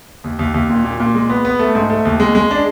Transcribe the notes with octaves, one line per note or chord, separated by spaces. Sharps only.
D#2
D#2
D#2
A#2
A#2
A#2
G#3
B3
B3
A3
G#2
A3
D#2
G#3
G#3
D4